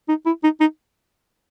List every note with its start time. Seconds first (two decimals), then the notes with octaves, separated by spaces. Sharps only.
0.08 D#4
0.26 E4
0.43 D#4
0.60 D#4